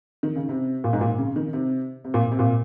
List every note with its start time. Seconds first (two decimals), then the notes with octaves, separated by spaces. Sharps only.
0.23 D#3
0.36 C#3
0.49 C3
0.84 A#2
0.93 G#2
1.01 A#2
1.18 C#3
1.36 D#3
1.53 C3
2.04 C3
2.14 A#2
2.32 C3
2.39 A#2